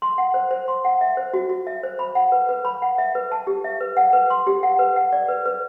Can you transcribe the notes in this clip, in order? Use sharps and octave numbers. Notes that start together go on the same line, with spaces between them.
C6
F#5
C5
C5
C6
F#5
E5
C5
F#4
F#4
E5
C5
B5
F#5
B4
B4
B5
F#5
E5
B4
A5
G4
E5
B4
F#5
B4
C6
G4
F#5
B4
F#5
D5
B4
B4